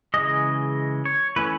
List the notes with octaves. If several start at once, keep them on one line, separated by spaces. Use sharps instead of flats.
C#3 E3 G#3 D#5
C#5
E3 A3 C#4 B4